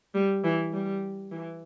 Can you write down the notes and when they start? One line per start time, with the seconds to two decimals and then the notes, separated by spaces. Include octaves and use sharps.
0.15 G3
0.44 E3
0.73 G3
1.31 E3